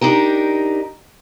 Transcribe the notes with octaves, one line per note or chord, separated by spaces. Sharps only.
D4 D#4 G4 A#4